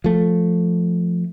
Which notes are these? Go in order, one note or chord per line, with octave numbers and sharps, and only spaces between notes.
F3 A3